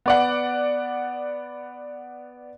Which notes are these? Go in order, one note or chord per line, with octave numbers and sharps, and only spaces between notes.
B3 D5 F#5